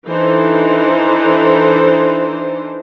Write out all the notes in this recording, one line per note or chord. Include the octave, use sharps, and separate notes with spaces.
E3 D4 D#4 A4 C5